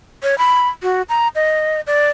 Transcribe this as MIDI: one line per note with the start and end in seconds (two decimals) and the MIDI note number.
0.23 0.38 73
0.38 0.68 83
0.83 1.02 66
1.09 1.28 82
1.35 1.81 75
1.87 2.10 74